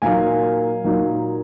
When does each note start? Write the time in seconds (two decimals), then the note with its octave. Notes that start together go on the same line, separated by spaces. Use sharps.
0.02 A#2 F#3 A#3 D#4 F5 G#5
0.84 A#2 F#3 A#3 D#4